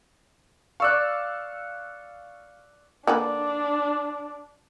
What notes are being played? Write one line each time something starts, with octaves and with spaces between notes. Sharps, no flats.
D5 F5 C#6 E6 F#6
D3 A#3 D4 B4